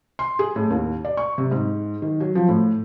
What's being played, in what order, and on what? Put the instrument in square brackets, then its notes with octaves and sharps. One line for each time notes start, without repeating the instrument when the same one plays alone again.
[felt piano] C6
G#4
A2
D#2
D5
C#6
C3
G#2
D#3
F#3
F3
A2